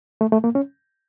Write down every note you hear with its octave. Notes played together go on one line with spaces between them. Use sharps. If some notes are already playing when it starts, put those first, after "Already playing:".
A3
A3
A#3
C#4